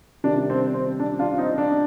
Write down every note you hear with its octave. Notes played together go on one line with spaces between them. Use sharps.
C3 D#3 G3 D4
C4
C4
D4
D4 F4
C4 D#4
D4